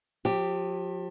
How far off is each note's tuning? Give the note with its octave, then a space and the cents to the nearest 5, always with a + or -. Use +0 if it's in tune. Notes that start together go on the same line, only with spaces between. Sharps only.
F3 +40 G4 +0